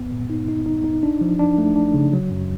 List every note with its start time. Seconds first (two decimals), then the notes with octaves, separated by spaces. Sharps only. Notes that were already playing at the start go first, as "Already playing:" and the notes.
Already playing: G2 B3
0.12 A#2
0.30 D#4
0.49 D#4
0.66 D#4
0.84 D#4
1.03 D4
1.21 F3
1.39 D4
1.58 A3
1.76 D4
1.94 C#3
2.13 F#3
2.31 F#2